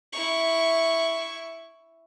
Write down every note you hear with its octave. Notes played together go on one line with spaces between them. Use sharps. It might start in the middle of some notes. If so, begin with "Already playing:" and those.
E4 C#6